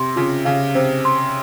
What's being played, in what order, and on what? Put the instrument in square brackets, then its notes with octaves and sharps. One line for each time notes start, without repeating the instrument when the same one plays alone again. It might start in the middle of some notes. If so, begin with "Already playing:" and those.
Already playing: [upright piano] C3 [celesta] C6
[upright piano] C#3 [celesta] F4
[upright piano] C#3 [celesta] F5
[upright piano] C3 [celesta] C5
[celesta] C6